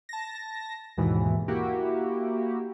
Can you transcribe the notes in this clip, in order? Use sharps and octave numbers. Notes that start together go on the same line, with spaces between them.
A5 A#6
D#2 G#2 B2 E3
A#3 E4 F#4 G4